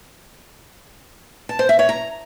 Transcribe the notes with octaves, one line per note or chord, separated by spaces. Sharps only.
A5
C5
E5
C#5
A#5